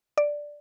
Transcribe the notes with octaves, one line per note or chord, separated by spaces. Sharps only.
D5